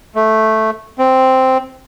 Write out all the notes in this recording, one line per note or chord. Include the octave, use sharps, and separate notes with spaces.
A3
C4